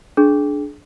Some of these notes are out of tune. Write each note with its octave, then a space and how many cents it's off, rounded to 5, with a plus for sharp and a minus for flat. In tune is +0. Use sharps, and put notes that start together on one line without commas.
D4 +0 G#4 +30